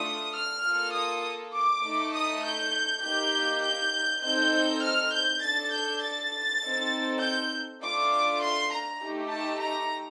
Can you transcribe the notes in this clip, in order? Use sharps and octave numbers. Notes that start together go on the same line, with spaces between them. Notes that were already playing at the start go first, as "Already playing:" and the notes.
Already playing: A3 D4 F4 A4 D#6
F6
A#3 F4 A4
D#6
D6
A3 D#4 A4
D#6
G6
A#3 D#4 G4 G6
G6
C4 D#4 A4 G6
F6
G6
D4 A4 A6
G6
A6
C4 D#4 A4
G6
A3 D4 F4 A4 D6
C6
A#5
A3 D#4 G4
A5
A#5